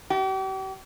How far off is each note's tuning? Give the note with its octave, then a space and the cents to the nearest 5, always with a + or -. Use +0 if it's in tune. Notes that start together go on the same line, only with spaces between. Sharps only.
G4 -40